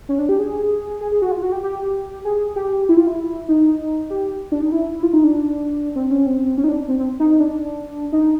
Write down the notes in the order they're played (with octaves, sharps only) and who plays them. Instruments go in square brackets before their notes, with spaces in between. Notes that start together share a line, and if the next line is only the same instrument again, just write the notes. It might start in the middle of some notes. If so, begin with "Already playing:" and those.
[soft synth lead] C#4
D4
G4
G#4
G#4
G#4
F#4
F4
F#4
G4
G4
G#4
G4
E4
F4
E4
D#4
G4
D4
D#4
E4
F4
D#4
D4
C4
C#4
C4
C#4
D#4
D4
C4
C4
D#4
D#4
D4
D#4